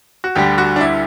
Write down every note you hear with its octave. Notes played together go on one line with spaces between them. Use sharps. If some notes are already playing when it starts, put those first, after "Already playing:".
F#4
D2 D3 G3 G4
F#4
D4
E4